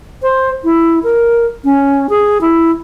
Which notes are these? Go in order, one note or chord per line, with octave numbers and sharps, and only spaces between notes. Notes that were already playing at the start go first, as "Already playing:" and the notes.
C5
E4
A#4
C#4
G#4
E4